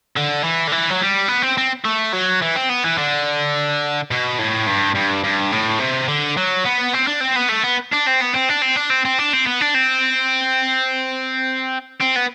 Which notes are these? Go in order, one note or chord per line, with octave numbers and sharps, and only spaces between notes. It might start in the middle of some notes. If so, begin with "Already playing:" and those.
D3
E3
D3
E3
F#3
G3
B3
C4
C4
A3
F#3
E3
C4
B3
E3
D3
B2
A2
G2
G2
G2
A2
C3
D3
F#3
B3
C4
D4
C4
B3
A3
B3
D4
C4
B3
C4
D4
C4
D4
C4
C4
D4
C4
B3
D4
C4
C4
B3